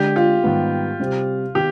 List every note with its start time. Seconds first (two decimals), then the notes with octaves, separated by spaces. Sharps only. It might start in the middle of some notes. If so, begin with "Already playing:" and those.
Already playing: D3 G#3 D4 G4
0.16 F4
0.44 G#2 D#3 G3 B3
0.99 C3 G3 C4 G4
1.55 D#3 B3 G4